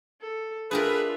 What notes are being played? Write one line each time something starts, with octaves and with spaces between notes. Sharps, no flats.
A4
D4 F4 G4 G#4 A#4 B4 E5